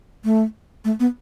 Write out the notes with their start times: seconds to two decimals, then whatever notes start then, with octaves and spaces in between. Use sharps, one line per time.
0.24 A3
0.85 A3
1.00 B3